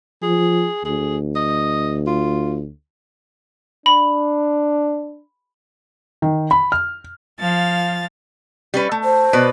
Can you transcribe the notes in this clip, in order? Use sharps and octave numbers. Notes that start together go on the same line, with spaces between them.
F3 G#4
D2 G#4
D#5
F4
D4 B5
D#3
B5
F6
F3 F5 A6
G3 C#4 B4
A3
C5
B2 B4 D5